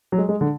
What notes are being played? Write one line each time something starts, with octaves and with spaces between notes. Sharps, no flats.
F#3
G#3
G#3
D3